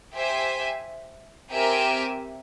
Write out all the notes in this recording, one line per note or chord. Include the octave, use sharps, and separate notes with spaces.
G4 C5 E5 G#5
C4 G4 A#4 E5 G#5